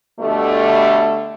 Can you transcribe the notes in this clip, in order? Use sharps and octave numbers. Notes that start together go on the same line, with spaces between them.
B2 D3 G3 A3